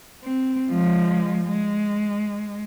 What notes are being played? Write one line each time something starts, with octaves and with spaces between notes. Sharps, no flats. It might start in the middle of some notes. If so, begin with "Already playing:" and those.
C4
F3 G#3
G#3